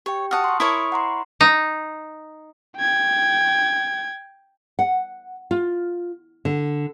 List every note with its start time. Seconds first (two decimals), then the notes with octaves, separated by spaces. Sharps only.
0.06 G4 C#5 G5
0.31 F#4 F#5 A5 D#6 F6
0.44 C6 C#6
0.60 E4 A#4 C#5 D#6
0.92 F#5 A#5 C6
1.41 D#4
2.78 G5 G#6
4.79 F#5
5.51 F4
6.45 D3